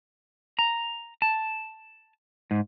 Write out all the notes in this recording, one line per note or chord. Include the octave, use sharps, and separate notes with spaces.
A#5
A5
G#2